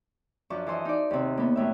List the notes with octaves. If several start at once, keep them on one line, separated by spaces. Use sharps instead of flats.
F#2 F3 D4 C#6
E3 A4 C5 D#5
D#4 D5
D#2 C3
A#3 B3
F#2 A2 E5